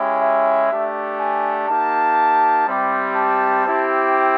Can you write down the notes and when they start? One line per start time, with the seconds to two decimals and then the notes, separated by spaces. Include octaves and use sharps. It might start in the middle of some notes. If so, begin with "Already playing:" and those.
Already playing: G#3 C#4 E4 G4
0.20 E5
0.70 A3 D4 G4
1.19 G#5
1.68 A#3 D#4 G4 A5
2.66 G3 C4 E4 G4
3.16 A5
3.65 C4 E4 G4